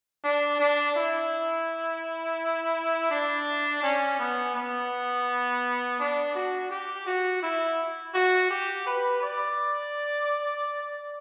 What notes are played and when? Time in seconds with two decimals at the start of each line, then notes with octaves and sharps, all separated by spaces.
0.24 D4
0.60 D4
0.96 E4
3.11 D4
3.83 C#4
4.19 B3
4.55 B3
5.99 D4
6.35 F#4
6.71 G4
7.06 F#4
7.43 E4
8.14 F#4
8.50 G4
8.86 B4
9.22 D5